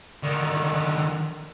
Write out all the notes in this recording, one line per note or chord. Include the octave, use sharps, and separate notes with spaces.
D3 D#3